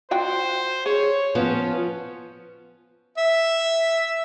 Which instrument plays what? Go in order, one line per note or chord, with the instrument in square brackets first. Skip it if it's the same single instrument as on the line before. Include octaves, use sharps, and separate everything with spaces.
[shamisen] F4 F#4 G5 [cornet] C5
[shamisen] G#4 [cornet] C#5
[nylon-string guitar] F3 B3 F4 [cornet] C#4
[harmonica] E5